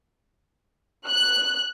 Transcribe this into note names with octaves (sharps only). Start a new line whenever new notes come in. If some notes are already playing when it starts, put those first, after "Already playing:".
F#6